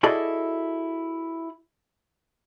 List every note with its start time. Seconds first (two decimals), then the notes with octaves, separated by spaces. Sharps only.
0.03 E4 F#4 G#4 A4 D5 D#5